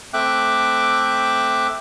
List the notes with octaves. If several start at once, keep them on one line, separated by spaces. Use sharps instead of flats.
A3 C4 E5 G5 D6 F#6